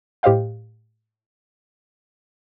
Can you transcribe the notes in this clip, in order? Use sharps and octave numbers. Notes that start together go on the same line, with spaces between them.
A2 G4 C5 D#5 F5 G5